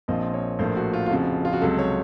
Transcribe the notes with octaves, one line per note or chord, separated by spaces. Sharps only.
A#1 A#2 F3 C4 D#5
C#5
A#1 A2 F3 A#3 C5
F#4
F4
F4
F1 F2 C#3 F3 F#4
F4
F#4
C#2 C3 F#3 A4
C#5